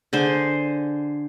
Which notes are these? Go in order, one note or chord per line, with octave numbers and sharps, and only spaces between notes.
D3 G#4 C5